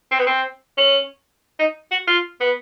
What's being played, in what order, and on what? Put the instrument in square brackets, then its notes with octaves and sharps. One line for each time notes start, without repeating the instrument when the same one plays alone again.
[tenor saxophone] C4
B3
C4
C#4
D#4
F#4
F4
B3